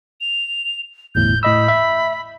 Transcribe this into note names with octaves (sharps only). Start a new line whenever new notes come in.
F7
G1 E2 A2 G6
A2 D#5 B5 E6
E5